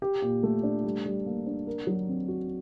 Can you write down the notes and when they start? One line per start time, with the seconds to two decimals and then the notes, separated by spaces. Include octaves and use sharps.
0.02 G4
0.22 A#2
0.43 A3
0.63 D4
0.84 G3
1.06 G3
1.26 A#3
1.46 D4
1.67 A#4
1.87 F#3
2.09 C4
2.28 F#4